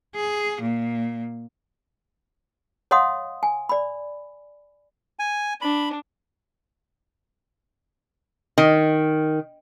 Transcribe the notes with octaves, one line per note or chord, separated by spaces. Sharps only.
G#4
A#2
C#5 D#5 F5 F#5 C6 D#6
G#5
D5 B5
G#5
D4 B5
D#3